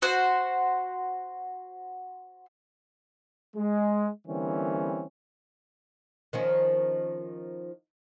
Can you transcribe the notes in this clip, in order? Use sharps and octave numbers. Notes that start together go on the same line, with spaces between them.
F#4 C5 F#5
G#3
D3 E3 G3 A#3 C4 C#4
D#3 F3 C#4